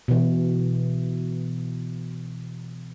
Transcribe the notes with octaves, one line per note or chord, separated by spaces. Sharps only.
B2 E3